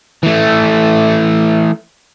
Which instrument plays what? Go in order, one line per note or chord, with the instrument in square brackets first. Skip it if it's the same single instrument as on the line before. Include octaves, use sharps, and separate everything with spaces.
[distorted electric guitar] E3 A3